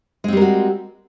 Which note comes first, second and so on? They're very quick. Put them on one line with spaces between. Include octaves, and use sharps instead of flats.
G#3 C4 G3 A#4 F#4